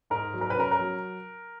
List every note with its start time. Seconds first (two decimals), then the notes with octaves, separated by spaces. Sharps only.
0.10 G#2 A#4
0.34 F#3
0.41 A#4
0.50 B4
0.57 C#4 A#4
0.71 A#4
0.79 F#3